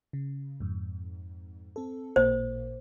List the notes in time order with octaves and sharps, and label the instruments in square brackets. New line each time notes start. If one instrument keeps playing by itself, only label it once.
[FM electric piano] C#3
F2 G#2
C4 A4
[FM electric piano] A1 A#2 A#3 [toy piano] C5